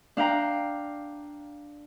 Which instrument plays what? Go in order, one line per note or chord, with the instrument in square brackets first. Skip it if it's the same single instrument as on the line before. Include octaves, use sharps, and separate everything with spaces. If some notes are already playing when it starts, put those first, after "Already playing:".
[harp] D4 F5 G5 A#5